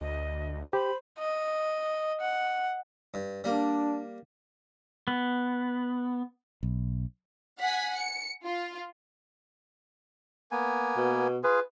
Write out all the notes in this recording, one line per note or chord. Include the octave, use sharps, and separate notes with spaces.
D2 D#5
G4 C5 B5
D#5
F#5
G2
G3 A#3 D4
B3
B1
F#5 G#5 B6
C#7
F4
A#3 B3 G#5
B2
F4 G#4 B4